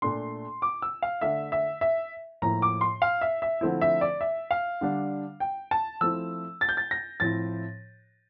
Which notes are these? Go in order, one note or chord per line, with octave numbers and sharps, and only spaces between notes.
A#2 A3 D4 C6
D6
E6
F5
D3 A3 D4 E5
E5
E5
A2 F3 A#3 E4 A#5
D6
C6
F5
E5
E5
D3 F3 A3 C4 E4
E5
D5
E5
F5
D3 G3 D4
G5
A5
F3 A3 C4 E4 E6
A6
G6
A6
A#6
A2 F3 C4 E4 A6